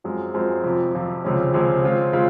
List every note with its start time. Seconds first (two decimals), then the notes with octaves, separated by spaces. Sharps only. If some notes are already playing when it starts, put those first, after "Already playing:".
0.04 F#2 F3 G#3 C4
0.34 F#2 F3 G#3 C4
0.64 F2 C3 F3
0.95 F2 C3 F3
1.24 C#2 C3 F3 G#3 C#4
1.53 C#2 C3 F3 G#3 C#4
1.83 C#3 G#3 C4 F4
2.13 C#3 G#3 C4 F4